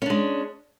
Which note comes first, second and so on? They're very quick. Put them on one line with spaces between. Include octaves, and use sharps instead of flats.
C#4 D4 G#3